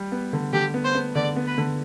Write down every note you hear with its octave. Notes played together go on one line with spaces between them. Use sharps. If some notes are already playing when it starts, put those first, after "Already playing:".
Already playing: G3
B3
D3
D3 G4
B3
C5
B3
D3 D5
B3
B4
D3